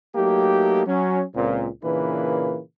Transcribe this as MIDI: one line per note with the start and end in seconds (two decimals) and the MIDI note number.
0.15 0.82 54
0.15 0.82 57
0.15 0.82 58
0.15 0.82 63
0.15 0.82 67
0.86 1.23 54
0.86 1.23 61
1.35 1.67 37
1.35 1.67 46
1.35 1.67 60
1.83 2.59 46
1.83 2.59 49
1.83 2.59 52
1.83 2.59 58
1.83 2.59 62
1.83 2.59 71